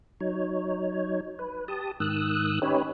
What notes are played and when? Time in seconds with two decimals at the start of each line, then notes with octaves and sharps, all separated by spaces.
0.21 F#3 D#4 C#5
1.39 B4
1.68 G4 A5 D#6
2.00 G#2 D#3 D#6 E6 F#6
2.62 C#4 D#4 G4 B4 C#5